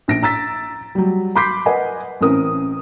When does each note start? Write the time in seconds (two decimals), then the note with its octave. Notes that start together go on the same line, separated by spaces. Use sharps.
0.08 A#1 A#6 D7
0.23 A#5 E6 A6 B6
0.95 F#3 G3
1.35 B5 C6 D6 G6 B6 C7
1.66 A#4 B4 D#5 F#5 G#5
2.21 A1 E3 C4 C#4 A#4 D#6